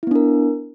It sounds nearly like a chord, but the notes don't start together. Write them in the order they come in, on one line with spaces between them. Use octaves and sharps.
E4 B3 D4 A#4